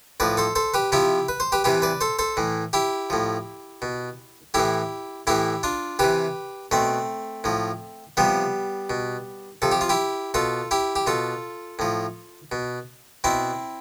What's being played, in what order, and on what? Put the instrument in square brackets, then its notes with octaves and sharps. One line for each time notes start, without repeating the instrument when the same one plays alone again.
[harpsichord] A2 F3 B4 D5
A4 C5
A4 C5
G4 B4
C3 F3 E4 G4
B4
C5
G4 B4
C3 E3 G4 B4
B4 D5
A4 C5
A4 C5
A2 E3
E4 G4
A2 F3
B2
A2 E3 E4 G4
A2 E3 E4 G4
D4 F4
C3 E3 G4 B4
B2 A3 C4
A2 F3
C3 F3 G3 B3
B2
C3 F3 A4
G4
F4
E4 G4
B2 F4 A4
E4 G4
G4
B2 F4 A4
A2 F3
B2
B2 C4 E4